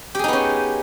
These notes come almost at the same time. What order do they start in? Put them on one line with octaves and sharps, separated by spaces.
G4 G#4 D#4 B3 C#4